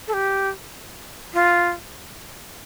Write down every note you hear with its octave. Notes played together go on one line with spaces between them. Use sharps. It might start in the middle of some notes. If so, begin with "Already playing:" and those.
A4
G4
F4